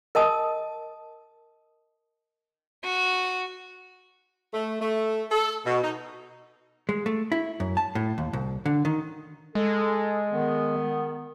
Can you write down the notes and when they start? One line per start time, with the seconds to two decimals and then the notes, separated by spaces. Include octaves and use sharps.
0.15 A#4 D#5 A5 D#6
2.84 F#4
4.54 A3
4.81 A3
5.31 A4
5.66 B2
5.83 D#4
6.89 G#3
7.06 A3
7.32 E4
7.60 F#2
7.77 A5
7.95 A2
8.18 D#2
8.33 C2
8.66 D3
8.85 D#3
9.55 G#3 A4
10.32 D#3 B3